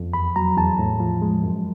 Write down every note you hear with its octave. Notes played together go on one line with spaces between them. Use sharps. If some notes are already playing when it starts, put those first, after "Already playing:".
Already playing: F2
E2 B5
F#3 A#5
E2 A5
A2
F3
G#3
F#2